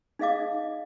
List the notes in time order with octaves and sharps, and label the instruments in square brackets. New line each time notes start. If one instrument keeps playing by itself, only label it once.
[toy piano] D#4 G#4 D#5 F5 D6